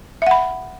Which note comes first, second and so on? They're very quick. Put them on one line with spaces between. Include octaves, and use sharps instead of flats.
E5 F#5 B5